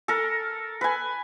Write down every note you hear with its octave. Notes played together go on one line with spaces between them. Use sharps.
A4 A#4
B4 G#5